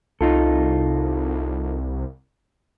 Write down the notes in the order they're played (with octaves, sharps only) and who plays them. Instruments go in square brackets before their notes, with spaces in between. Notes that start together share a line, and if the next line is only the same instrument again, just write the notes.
[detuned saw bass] C2 [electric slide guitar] D#4 F4 A4